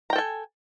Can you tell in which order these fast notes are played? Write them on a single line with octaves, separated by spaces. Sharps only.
A#5 G5 A4 G#5